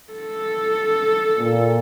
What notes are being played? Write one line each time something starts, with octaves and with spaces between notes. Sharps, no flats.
A4
A#2